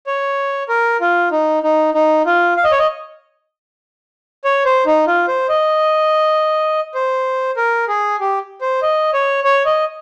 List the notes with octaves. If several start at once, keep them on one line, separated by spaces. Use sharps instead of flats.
C#5
A#4
F4
D#4
D#4
D#4
F4
F5
D#5
C#5
D#5
C#5
C5
D#4
F4
C5
D#5
C5
A#4
G#4
G4
C5
D#5
C#5
C#5
D#5